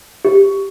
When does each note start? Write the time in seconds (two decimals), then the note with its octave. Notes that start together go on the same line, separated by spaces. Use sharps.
0.25 G4